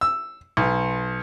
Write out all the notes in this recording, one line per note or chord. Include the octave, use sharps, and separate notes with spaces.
E6
B1